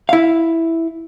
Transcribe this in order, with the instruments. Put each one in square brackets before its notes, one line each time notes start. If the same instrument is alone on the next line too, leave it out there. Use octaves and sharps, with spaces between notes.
[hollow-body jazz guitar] E4 F5